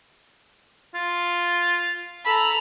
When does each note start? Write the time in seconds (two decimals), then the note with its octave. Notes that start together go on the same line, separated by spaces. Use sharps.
0.94 F4
2.25 A4 A#5 B5